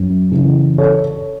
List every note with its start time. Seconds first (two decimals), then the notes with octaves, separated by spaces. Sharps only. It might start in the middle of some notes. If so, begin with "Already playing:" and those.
Already playing: F#2
0.31 C#3 E3
0.78 A4 C#5